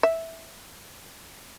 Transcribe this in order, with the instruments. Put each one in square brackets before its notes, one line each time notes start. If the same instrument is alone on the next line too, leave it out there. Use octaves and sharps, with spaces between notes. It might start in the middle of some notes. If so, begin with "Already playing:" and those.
[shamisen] E5